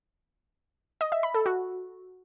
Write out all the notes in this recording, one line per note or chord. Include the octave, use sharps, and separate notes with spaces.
D#5
E5
B5
A4
F#4